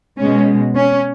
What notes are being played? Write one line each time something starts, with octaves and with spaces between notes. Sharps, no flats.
B2 G#3 C#4
C#4